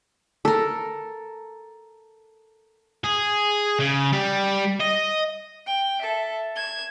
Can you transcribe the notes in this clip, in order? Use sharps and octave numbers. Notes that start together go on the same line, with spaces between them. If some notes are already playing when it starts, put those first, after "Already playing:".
A4 A#4
G#4
C#3
G3
D#5
G5
A4 E5
G#6 E7